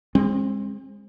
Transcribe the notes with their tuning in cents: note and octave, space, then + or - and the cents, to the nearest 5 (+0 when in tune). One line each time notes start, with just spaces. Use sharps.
G#3 -25 C4 +30